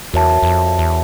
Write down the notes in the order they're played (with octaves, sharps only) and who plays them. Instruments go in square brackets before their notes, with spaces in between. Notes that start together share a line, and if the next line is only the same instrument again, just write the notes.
[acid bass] E2 [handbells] F#4 A#4 C#5 E5 A5
[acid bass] E2
F2
E2